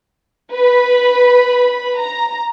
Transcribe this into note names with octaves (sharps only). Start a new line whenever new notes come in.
B4 B5
A#5